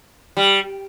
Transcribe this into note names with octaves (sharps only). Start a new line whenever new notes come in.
G3